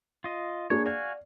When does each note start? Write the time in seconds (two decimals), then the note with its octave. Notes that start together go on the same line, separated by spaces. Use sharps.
0.24 F4 D#5
0.70 A#3 D4 G#4 C#5
0.86 F#4 D5 F5 G#5